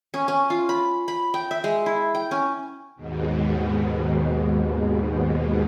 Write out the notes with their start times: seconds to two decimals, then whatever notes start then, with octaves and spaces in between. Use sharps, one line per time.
0.14 C#4
0.28 C#4
0.50 F4
0.69 B5
1.08 B5
1.34 G5
1.51 E5
1.64 G#3
1.86 E4
2.15 G5
2.31 C#4
2.96 D#2 G#2 B2